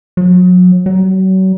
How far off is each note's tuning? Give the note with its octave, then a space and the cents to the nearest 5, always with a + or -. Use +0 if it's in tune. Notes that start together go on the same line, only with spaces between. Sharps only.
F#3 -35
F#3 +35